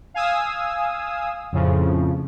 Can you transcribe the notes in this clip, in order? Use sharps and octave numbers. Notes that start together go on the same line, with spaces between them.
F5 G#5 D#6 E6
F2 A2 C#3 F3